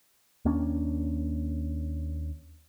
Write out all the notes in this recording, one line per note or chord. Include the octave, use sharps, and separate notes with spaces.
D#2 A#3 C#4 D4